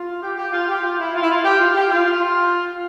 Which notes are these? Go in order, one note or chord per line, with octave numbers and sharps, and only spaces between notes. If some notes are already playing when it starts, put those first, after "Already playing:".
Already playing: F4
G4
G4
F4
G4
F4
E4
F4
E4
F4
G4
F4
G4
F4